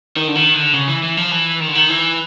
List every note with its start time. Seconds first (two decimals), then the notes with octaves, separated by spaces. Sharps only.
0.16 D#3
0.28 D3
0.35 D#3
0.54 D3
0.73 C#3
0.88 E3
1.03 E3
1.17 F3
1.31 E3
1.60 D#3
1.68 D3
1.75 D#3
1.89 E3